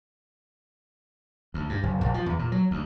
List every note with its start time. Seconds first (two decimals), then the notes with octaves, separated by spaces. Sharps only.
1.54 D2
1.69 G2
1.83 F#1
2.01 A#1
2.14 F3
2.26 E2
2.39 A#2
2.52 F#3
2.71 D2